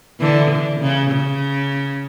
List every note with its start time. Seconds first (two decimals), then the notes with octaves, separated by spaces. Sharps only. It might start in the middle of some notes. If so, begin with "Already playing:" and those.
0.20 D3 E3
0.51 D3
0.81 C#3
1.11 C#3